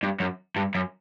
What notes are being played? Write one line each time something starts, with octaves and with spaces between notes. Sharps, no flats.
G2
F#2
G2
F#2